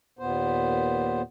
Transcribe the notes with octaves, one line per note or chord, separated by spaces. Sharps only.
D#2 A#2 B3 C5